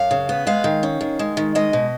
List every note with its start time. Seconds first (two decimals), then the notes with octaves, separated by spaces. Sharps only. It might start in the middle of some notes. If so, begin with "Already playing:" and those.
Already playing: F#2 F5
0.11 C#3
0.29 B3
0.47 G#3 F5
0.64 D#3
0.83 C#4
1.01 D#3
1.19 G#3
1.37 D#3
1.55 G#3 D#5
1.73 B2